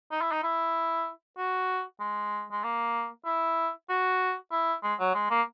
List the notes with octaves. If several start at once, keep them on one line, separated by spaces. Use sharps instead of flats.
D#4
E4
D#4
E4
F#4
G#3
G#3
A#3
E4
F#4
E4
G#3
F#3
G#3
A#3